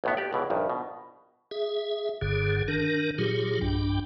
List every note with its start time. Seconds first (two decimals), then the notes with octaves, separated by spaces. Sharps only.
0.04 B1 A2 B3
0.17 G4 D5
0.33 C#2 B2 E3
0.50 A#1 G2 D#3
0.70 B2
1.51 G#4 E5
2.21 F#1 G2 D3 G#4
2.68 D#3 D4 A#4
3.18 A#2 F#3 F4 G4 G#4
3.61 B1 G2 D4 G5